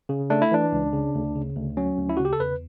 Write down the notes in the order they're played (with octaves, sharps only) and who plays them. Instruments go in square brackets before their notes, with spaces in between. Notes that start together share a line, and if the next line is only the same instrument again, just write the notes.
[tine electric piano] C#3
A3 D4
E4
E3 D4
C#2
C#3
D2
C#3
D2
F#3 C#4
D2
E4
F#4
C#3
G4
A4
E2 B4